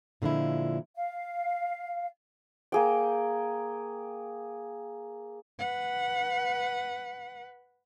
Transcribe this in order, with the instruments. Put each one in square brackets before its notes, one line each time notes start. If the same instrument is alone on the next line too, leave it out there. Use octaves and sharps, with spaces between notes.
[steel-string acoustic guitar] A#2 D3 F3 G#3 E4
[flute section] F5
[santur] A#3 G#4 G5
[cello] B4 F#5